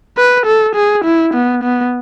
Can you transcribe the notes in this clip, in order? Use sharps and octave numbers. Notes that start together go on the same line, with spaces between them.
B4
A4
G#4
E4
B3
B3